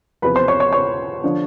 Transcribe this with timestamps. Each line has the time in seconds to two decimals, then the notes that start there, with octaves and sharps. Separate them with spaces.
0.22 E2 C3 F3 B4 B5
0.36 C5 C6
0.48 C#5 C#6
0.60 C#5 C#6
0.73 C#5 C#6
1.24 D3 F3